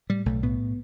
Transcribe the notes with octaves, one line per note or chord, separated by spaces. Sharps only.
A2 G3
B1 A3
A2 B3